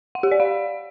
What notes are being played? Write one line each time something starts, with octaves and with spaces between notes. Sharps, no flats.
F#5
G4
D5
F5